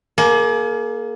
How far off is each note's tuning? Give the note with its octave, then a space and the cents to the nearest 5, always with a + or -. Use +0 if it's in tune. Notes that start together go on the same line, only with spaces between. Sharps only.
A#3 +10 G#4 +40